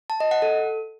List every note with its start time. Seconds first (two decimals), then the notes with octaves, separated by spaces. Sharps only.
0.10 A5
0.20 D#5
0.31 F#5
0.42 A4